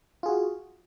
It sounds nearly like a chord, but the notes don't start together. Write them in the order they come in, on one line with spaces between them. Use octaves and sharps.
F4 G#4 F#4